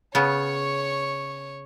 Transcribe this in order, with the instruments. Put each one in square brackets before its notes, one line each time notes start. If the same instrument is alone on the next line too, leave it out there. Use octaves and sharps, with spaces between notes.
[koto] C#3 B3 [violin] C#5 C#6